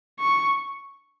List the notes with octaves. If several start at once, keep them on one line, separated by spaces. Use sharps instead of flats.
C#6